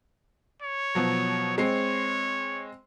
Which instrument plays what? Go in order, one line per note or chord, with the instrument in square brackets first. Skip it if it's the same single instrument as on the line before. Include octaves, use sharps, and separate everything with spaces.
[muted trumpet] C#5
[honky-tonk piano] B2 F3 F#3
[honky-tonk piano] G#3 C4 C7 [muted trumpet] C#5